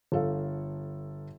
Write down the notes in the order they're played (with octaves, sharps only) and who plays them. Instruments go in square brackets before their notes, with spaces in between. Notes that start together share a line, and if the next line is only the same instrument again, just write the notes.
[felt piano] G1 A4 F5